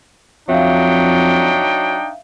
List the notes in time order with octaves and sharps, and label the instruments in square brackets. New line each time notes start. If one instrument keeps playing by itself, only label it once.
[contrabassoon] F2 [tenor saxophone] F#3 [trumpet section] D4 D#4 G5 [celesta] E5 F5